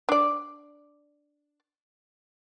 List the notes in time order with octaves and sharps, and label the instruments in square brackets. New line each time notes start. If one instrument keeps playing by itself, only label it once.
[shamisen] D4 D5